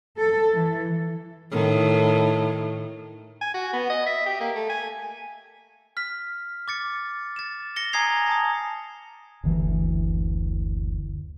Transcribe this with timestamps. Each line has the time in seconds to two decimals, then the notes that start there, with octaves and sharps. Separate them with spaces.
0.18 A4
0.53 E3
1.52 A2 D#3
3.41 G#5
3.54 F#4
3.73 B3
3.90 D#5
4.06 E5
4.26 G4
4.40 A#3
4.56 A3
4.69 G#5
5.97 F6 B6
6.68 D6 A6 C#7
7.36 A6 E7
7.76 A#6 C#7 G7
7.93 G#5 A#5 D#6 G#6 C7 F7
8.28 A5 D#6
9.44 F#1 D2 E3